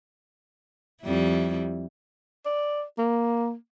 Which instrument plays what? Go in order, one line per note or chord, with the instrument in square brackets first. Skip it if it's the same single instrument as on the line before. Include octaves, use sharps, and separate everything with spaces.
[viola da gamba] F2 G3 E4
[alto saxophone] D5
A#3